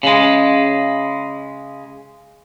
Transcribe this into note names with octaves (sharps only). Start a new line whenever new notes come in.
C#3 G#3